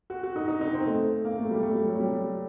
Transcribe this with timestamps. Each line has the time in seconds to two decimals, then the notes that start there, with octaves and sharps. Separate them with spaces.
0.10 F#4
0.23 F#4
0.36 D#4
0.48 D#4
0.61 D#4
0.74 C4
0.87 A3
1.24 A#3
1.38 A3
1.51 G3
1.63 A3
1.75 G3
1.87 F#3
2.00 G3